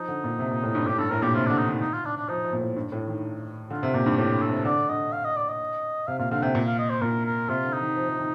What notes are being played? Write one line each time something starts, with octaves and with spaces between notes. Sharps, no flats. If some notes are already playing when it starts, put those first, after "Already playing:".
Already playing: F3 D#4
D3
A#2
C3
A#2
A2
G2
A2 G4
G2 A4
A2 A#4
A#2 G4
C3 F4
D3 D4
D#4
D#3
D#4
F4
D4
D4
F3 D#4
F3
A#2
A2
G2
A2
D#3
D3 F4
C3
A#2 G4
G2
A2 G4
A4
C3
D3 D5
D3 D#5
F5
D#5
D5
D#5
C3 F5
A#2 F5
D3 F5
C3 G5
A#2
F5
D#5
C5
A#2 A#4
A#4
C3 F4
D3
D#4
D#3
F3
F3
D#3